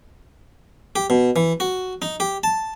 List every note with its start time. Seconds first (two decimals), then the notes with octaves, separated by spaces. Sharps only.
0.96 G4
1.10 B2
1.36 E3
1.60 F#4
2.02 D#4
2.20 G4
2.43 A5